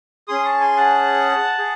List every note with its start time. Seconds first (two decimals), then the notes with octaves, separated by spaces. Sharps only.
0.28 C#4 G#4 C6 D#6
0.45 A5 C#6
0.60 G#5 C6
0.77 F#5 A5
1.58 G#4